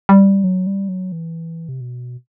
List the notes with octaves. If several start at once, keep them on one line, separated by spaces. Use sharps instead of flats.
G3
F#3
G3
F#3
E3
C3
B2